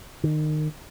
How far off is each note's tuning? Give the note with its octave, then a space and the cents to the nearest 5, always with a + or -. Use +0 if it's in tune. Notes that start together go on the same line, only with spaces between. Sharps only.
D#3 -25